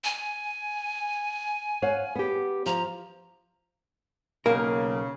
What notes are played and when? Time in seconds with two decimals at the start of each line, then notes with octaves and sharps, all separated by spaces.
0.04 G#5
1.82 C#5 F5 F#5
2.15 B3 G4
2.66 F3 A#5
4.46 B1 C#3 A#3 A#4